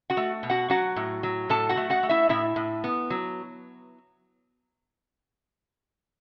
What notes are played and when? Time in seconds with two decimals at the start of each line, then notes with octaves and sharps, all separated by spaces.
0.10 F#4 F#5
0.17 A3
0.43 B2
0.50 F#4 F#5
0.70 F#3 F#4 F#5
0.96 A2
1.23 F#3
1.49 A2 A4 A5
1.69 F#4 F#5
1.77 A3
1.90 F#4 F#5
2.03 A3
2.09 E4 E5
2.29 A2 E4 E5
2.56 A2
2.84 B3
3.10 F#3